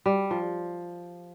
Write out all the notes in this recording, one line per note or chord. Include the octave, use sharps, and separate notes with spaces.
G3
F3